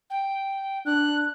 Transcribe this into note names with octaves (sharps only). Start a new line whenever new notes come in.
G5
D4 F#6